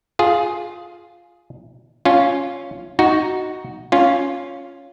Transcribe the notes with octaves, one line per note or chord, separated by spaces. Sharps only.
F4 G#4
C#4 F4
D#4 F#4
C#4 F4